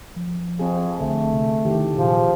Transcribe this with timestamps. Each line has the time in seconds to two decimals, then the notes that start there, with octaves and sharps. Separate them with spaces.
0.16 F3
0.59 F2 C4 G#4
1.00 A#1 D3 A3
1.33 C3
1.65 D#3 E3 G4
1.98 A#2 F3 G4 G#4